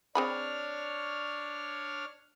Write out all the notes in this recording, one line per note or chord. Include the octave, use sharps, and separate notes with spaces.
C4 D4 G#4 C#5 B5 F6